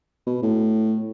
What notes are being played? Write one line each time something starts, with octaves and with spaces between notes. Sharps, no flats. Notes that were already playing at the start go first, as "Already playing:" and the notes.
B2
A2